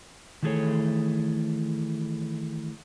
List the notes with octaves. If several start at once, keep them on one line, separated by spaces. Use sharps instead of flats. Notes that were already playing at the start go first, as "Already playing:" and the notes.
D#3 E3 A3 G#4 A4 C#5